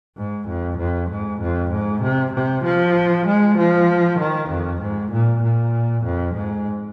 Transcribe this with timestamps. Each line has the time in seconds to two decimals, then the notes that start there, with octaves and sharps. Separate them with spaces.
0.17 G#2
0.48 F2
0.78 F2
1.10 G#2
1.41 F2
1.72 G#2
2.02 C3
2.34 C3
2.65 F3
3.27 G#3
3.58 F3
4.19 D#3
4.49 F2
4.82 G#2
5.12 A#2
5.43 A#2
6.04 F2
6.35 G#2